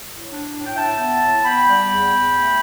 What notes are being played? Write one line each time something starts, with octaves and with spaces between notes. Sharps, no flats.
A2
D4
A2
G5
A2 E5 A5
B3
A2
B3 G5 B5
G3
E2
E2
A3